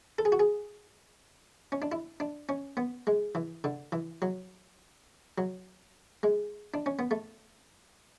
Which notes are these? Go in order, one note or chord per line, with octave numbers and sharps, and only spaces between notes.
A4
G#4
F#4
G#4
C#4
D4
E4
D4
C#4
B3
G#3
E3
D3
E3
F#3
F#3
G#3
D4
C#4
B3
A3